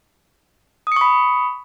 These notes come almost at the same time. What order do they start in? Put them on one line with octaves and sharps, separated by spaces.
D#6 C#7 C#6 B5